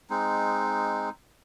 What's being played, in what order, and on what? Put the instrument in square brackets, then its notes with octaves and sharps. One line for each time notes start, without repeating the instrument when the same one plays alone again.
[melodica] G#3 C4 D#4